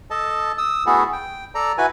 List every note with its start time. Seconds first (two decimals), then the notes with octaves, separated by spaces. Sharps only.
0.10 A4 D#5 A5
0.58 D#6 E6
0.86 A3 B3 E4 F#4 G#4 A4
1.13 G5
1.55 A4 D5 A#5
1.78 E4 F#4 B4 G#5